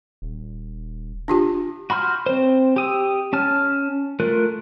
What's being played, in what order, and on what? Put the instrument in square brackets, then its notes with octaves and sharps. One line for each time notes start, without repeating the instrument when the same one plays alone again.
[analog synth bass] D#1
[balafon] D4 F4 G4
[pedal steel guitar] F#4 B5 C6 F6 G6
C4 C5
G4 D#6 E6
C#4 A5 F6
A3 F4 A#4 F#6